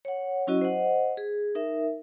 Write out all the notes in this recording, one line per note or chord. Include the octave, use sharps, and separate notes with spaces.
C#5 F#5
F#3 C#4 E4 F#4 D#5
C5 D#5 F#5
G#4
D#4 A#4 E5